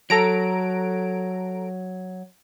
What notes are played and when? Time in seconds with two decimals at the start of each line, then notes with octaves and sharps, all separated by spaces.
0.10 F#3 A4 A#5 D7